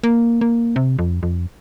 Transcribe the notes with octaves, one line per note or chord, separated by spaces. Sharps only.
A#3
A#3
C3
F2
F2